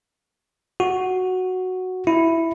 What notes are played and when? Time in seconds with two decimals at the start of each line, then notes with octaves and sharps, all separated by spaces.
0.80 F#4
2.07 E4